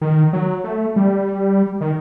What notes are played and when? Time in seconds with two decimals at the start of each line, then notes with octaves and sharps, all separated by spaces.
0.01 D#3
0.33 F#3
0.64 A3
0.96 G3
1.81 D#3